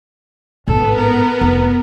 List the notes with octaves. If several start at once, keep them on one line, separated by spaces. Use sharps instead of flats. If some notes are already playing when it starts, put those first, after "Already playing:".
A1 G#2 B3 A4
A#4
F1